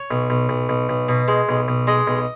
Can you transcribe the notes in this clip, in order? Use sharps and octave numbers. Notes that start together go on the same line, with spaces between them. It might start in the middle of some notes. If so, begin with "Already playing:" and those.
Already playing: C#5
B1
B1
B1
B1
B1
B2
G#3
B1
B1
G#3 D#5
B1